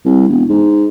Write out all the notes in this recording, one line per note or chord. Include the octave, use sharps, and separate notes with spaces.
C2
E1
G#2